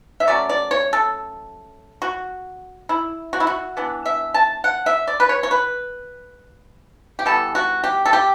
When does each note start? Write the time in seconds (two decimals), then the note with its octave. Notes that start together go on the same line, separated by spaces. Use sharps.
0.20 E5
0.27 F#3 A3 C#4 D5
0.49 D5
0.71 C#5
0.93 A4
2.02 F#4
2.89 E4
3.33 F#4
3.40 E4
3.47 F#4
3.77 E3 B3 D4
4.06 E5
4.34 A5
4.64 F#5
4.86 E5
5.07 D5
5.20 B4
5.29 C#5
5.43 C#5
5.51 B4
7.19 G4
7.25 E3 G3 B3 A4
7.55 F#4
7.84 G4
8.05 A4
8.13 G4